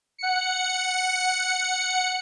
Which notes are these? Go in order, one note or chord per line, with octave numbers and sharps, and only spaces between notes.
F#5 C#7